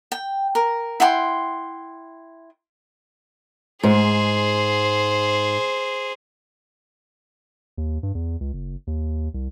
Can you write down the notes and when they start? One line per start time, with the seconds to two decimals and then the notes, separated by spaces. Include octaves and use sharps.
0.12 G5
0.55 A#4
1.00 E4 F#5 G5 C6
3.83 G#2 G#4 C5
7.78 D#2
8.03 G2
8.15 E2
8.40 C#2
8.53 F#1
8.87 D#2
9.34 C2